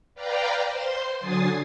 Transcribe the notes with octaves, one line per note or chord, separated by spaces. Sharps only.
B4 D5 F5 G5 A#5
C5 C6
D3 F#3 G#5 D#6 A6 C7